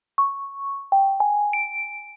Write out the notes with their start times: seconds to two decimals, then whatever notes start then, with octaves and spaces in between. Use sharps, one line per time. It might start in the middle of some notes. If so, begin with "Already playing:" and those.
0.18 C#6
0.92 G5
1.20 G#5
1.53 D7